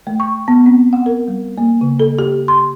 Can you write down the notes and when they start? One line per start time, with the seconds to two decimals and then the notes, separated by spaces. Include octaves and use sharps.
0.07 A3
0.20 C#6
0.48 B3
0.66 C4
0.93 F#5
1.06 A#4
1.28 G3
1.58 A#3
1.81 C#3
2.00 A4
2.19 G4
2.48 C6